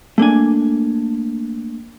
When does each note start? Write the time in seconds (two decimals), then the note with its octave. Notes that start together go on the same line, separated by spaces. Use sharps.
0.18 A3 A#3 D4 G#5